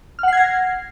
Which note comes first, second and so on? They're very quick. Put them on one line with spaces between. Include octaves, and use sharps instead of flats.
F6 F#5 C7 G#6 A#6